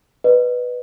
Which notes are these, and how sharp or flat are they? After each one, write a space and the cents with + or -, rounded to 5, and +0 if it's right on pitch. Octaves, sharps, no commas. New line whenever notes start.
B4 +0 D#5 -40